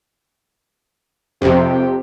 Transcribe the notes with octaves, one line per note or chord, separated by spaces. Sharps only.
F2 C3 G4